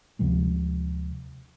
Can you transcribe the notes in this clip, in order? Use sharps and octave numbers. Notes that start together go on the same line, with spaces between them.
D2 C3 F3 G#3